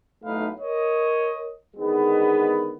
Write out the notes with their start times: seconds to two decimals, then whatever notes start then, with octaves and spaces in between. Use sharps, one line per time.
0.25 B1 A2 A3 D#4 B4 F5
0.60 A#4 C#5 D#5
1.77 D3 D#3 G#3 B3